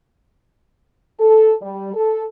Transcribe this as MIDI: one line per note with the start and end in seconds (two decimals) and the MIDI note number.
1.19 1.53 69
1.61 1.90 55
1.94 2.24 69